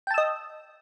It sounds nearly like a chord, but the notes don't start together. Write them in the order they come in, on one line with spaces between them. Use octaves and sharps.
G5 A5 E6 D#5